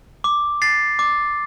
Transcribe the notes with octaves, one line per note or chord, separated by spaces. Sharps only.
D6
A6 C7
D6